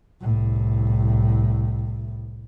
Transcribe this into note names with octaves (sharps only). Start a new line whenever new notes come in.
C2 A2